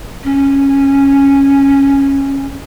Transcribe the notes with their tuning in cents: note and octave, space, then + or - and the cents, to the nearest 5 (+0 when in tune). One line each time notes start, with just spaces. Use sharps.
C#4 -10